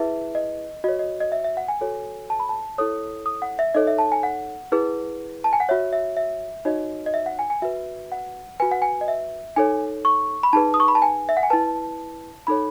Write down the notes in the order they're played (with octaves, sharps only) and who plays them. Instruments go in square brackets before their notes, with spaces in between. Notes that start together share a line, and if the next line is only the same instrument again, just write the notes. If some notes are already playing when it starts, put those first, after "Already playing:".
Already playing: [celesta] E4 G#4 B4 E5
D#5
F#4 D#5
C#5
D#5
D#5
E5
E5
F#5
G#5
F#4 A4 C#5
A5
B5
A5
E4 A4 C#5 D#6
D#6
F#5
E5
D#4 A4 C#5 D#5
E5
A5
G#5
F#5
E4 G#4 B4
A5
G#5
F#5
F#4 C#5 E5
E5
E5
D#4 F#4 C#5 D#5
D#5
E5
F#5
G#5
G#5
F#4 B4 E5
F#5
F#4 B4 G#5
F#5
G#5
D#5
E5
D#4 A4 C#5 G#5
C#6
B5
D#4 G#4 B4 A5
D#6
C#6
B5
A5
G#5
E5
F#5
G#5
E4 B4 A5
D#4 A4 C#5 B5